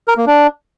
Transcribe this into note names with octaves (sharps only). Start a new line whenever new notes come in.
A#4
A#3
D4